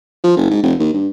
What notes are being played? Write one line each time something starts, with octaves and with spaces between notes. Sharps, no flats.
F3
F#1
G#2
F1
D#2
G2